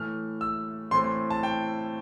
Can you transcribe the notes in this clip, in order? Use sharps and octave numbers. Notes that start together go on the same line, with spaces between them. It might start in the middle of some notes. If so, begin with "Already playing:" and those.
Already playing: A2 E3 A3 F6
E6
A2 E3 A3 C4 C6
C6
A5
G5